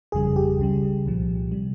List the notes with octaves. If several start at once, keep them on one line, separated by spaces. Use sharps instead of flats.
G1 F2 C#3 G3 G#4
G4
C#2 C#3 G3
C2 A#2 F3
C3 G3